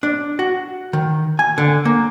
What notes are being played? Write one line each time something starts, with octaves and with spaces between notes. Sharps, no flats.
D4
F#4
D#3
G#5
D3
A#3